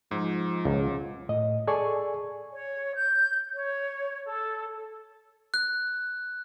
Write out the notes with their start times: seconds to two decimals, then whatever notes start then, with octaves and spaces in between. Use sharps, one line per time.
0.11 G#2 F3
0.65 C#2
1.29 A2 D#5
1.67 G#4 A4 D5 G#5 C#6
2.53 C#5
2.95 G6
3.55 C#5
4.27 A4
5.54 F#6